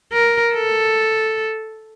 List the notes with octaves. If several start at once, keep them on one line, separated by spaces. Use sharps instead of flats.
A#4
A4